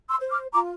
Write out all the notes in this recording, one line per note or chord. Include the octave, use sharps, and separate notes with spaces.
C6 E6
C5
D6 F6
F4 A#5 D6